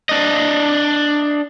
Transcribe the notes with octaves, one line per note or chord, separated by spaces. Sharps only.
D4 D#5